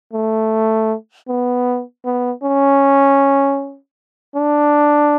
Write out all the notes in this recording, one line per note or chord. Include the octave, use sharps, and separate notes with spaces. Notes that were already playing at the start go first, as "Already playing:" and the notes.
A3
B3
B3
C#4
D4